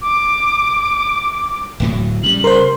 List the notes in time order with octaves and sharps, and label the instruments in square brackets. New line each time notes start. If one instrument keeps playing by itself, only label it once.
[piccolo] D6
[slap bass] D1 A2 F#3
[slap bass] C#3 G3 [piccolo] F#7
[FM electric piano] A#4 C5 [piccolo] C6